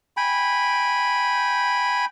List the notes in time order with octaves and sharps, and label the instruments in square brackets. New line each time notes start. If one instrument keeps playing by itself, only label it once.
[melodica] G5 G#5 B5